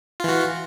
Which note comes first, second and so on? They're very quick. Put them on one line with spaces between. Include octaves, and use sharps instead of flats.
F4 E3 F#4